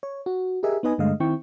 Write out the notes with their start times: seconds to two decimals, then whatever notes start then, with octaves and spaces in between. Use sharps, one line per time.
0.03 C#5
0.26 F#4
0.63 G4 G#4 A#4 D#5 E5 G#5
0.83 B3 D#4 B4 D#5 G#5
0.98 G2 D3 G#3 A3 D#5 F5
1.20 D#3 C4 E4 G5 C#6